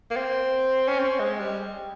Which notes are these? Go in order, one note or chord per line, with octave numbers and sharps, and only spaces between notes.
A#3
C4
C#4
C4
G#3
G3